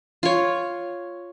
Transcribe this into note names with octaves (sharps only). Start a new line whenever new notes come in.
F4 C#5